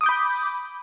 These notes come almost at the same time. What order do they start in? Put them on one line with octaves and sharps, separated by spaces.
D#6 D6 G6 B5